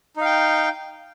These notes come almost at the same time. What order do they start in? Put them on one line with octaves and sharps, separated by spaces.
D#4 F5 G5